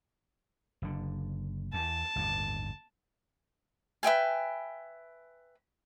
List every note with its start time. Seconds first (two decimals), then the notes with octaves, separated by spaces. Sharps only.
0.82 F#1 D3
1.74 E2 A5
2.16 G1 D#2 A2
4.03 B4 E5 G5 G#5